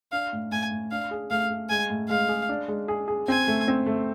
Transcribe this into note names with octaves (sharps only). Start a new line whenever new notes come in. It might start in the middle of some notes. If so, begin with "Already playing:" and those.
D4 F5
A2
A2 G#5
A2
D4 F5
G#4
A3 F5
A3
G#3 G#5
A2
G#3 F5
G#4
D4
G#3
G#4
G#4
C4 G#5
A3
C4
A3